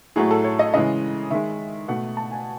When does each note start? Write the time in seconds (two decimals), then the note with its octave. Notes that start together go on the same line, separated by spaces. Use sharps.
0.16 A2 F#3 A3 G#4
0.31 A4
0.44 C#5
0.59 D#5
0.74 C#3 E3 G#3 D#5
1.31 D#3 G#3 E5
1.88 B2 A3 F#5
2.17 A5
2.31 G#5